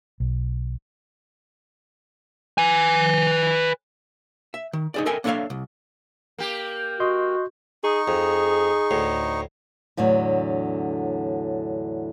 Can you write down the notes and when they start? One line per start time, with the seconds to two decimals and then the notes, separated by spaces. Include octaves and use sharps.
0.20 B1
2.58 B4 G#5
4.54 E5
4.73 D#3
4.94 D#4 G#4 D5
5.06 A4 A#4 D#5 E5 G5 G#5
5.24 A#3 D4 A4 C#5 E5 F5
5.50 C2
6.38 A#3 G4
7.00 F#4 D#5 C6 G6
7.84 D#4 G#4 C#6
8.08 F2 G#4
8.91 D2 A2
9.97 E2 A2 D3 F#3